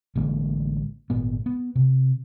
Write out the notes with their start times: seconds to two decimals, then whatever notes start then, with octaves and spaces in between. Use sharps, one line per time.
0.16 A1 D3 G#3 A#3
1.10 G#1 A#2 B3
1.46 B3
1.76 C3